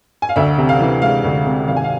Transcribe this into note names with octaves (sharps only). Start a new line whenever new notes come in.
G#5
F5
D2 E5
C3
F5
E3
G#3 F5
D2
C3
G#1 F5
G#5
F5